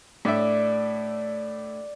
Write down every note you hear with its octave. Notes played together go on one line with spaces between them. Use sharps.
A2 D4 D5 E5